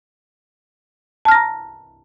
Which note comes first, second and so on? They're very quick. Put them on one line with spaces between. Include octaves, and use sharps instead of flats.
A5 F6 A#6 A#5